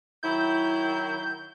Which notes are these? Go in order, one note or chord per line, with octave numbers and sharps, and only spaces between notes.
D#3 F#3 E4 G6